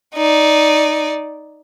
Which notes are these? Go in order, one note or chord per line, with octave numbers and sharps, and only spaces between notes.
D#4 D5